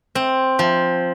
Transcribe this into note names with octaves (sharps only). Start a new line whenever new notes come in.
C4
F3